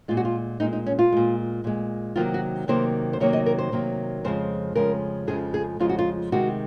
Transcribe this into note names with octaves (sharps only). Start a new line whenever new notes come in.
A#2 G#3 F4
F#4
F4
A#2 G#3 D#4
D#4
C#4
F4
A#2 G#3
A#2 G#3
C3 D#3 F#3 A#3 F4
F#4
C3 D#3 F#3 A#3 C5
C5
C3 D#3 F#3 A#3 C#5
D#5
A#4
C5
C3 D#3 F#3 A#3
F2 C#3 F3 G#3 C5
F2 C#3 F3 G#3 A#4
F2 C#3 F3 G#3 G#4
G#4
F2 C#3 F3 G#3 F4
F#4
F4
C3 D#3 G#3 F#4